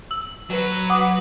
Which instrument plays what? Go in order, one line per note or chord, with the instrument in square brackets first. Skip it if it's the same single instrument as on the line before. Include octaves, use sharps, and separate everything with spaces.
[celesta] E6 F#7
[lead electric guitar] F#3 [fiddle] B4
[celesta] F#5 D6 D#6